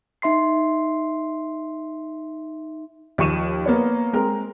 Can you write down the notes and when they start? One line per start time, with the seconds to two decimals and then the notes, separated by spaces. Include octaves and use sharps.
0.22 D#4 E5 C6 C7
3.18 D#2 F3 C#6 D#7 E7
3.66 A#3 B3 C#5
4.13 G#3 C4 A#4